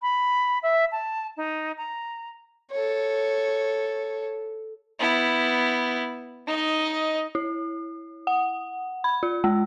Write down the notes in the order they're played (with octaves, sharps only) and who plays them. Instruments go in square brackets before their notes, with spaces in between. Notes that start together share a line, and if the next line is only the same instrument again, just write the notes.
[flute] B5
E5
A5
D#4
A#5
[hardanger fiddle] A4 C#5
[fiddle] B3 E4
D#4 D#5
[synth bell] E4
F#5
B5
F4
G#3